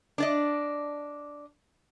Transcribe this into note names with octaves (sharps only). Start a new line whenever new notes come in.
D4 D5 D#5